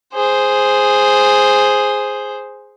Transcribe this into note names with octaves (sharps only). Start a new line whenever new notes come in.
G#4 C5